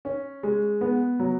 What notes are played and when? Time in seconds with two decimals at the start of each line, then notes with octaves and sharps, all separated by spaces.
0.05 C#4
0.43 G#3
0.81 B3
1.20 F#3